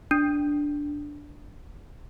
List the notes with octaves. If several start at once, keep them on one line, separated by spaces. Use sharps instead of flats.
D4